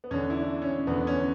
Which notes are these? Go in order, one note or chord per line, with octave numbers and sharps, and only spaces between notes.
B3
E2 D3 C#4
E4
D4
C#4
E2 D3 B3
C#4